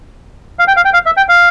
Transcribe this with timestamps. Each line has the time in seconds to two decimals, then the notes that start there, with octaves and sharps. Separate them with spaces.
0.59 F5
0.68 G5
0.76 F5
0.85 G5
0.93 F5
1.06 E5
1.17 G5
1.29 F5